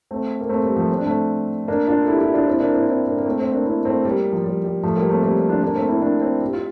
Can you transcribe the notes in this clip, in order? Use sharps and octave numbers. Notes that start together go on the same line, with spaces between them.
A3 C4
A#3
A3 C4
G3
F3 A3
C4
D4
A3 C4
A#3 D4
D4 F4
A4
E4 G4
E4 G4
D4 F4
C4 E4
A#3 D4
C4 E4
C4 E4
A#3 D4
A#3
A3 C4
A3 C4
A#3 D4
C4 E4
A3 C4
G3 A#3
F3
G3
G3
F3 A3
G3 A#3
A3 C4
G3 A#3
G3
D4 F4
A#3 D4
A3 C4
C4 E4
A#3 D4
C4 E4
G4
F4